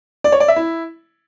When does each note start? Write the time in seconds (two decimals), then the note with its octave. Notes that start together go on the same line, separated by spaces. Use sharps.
0.24 D5
0.32 C#5
0.40 D5
0.48 E5
0.56 E4